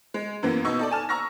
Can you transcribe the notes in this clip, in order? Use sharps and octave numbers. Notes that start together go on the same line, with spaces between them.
G#3
F#2 E3 A#3 B3
B2 B3 D#4 C#6 E6
D#4 A4 D5
G#5 A5 F6
A#5 C#6 E6 F6 A#6